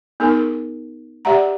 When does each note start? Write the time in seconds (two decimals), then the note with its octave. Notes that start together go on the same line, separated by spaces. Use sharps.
0.20 B3 D#4 G#4 A#4
1.25 G4 D5 E5 F#5 A#5